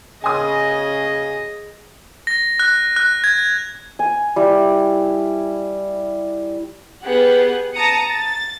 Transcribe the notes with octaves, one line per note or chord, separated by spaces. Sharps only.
C#3 G#4 D#5 G#5 D#6
A#6
F#6
F#6
G#6
G#5
G3 E4
B3 G4 G#4 F#5
A5 A#5 D#6 C#7
A6